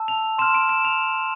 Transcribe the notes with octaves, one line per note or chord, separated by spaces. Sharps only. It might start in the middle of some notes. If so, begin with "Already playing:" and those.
Already playing: A5 E6
F7
C6 F6 E7
D7
E7
F7